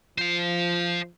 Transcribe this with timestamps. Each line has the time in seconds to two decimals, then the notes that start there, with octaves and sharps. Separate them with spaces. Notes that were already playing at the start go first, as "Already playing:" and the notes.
0.18 F3 C5 F5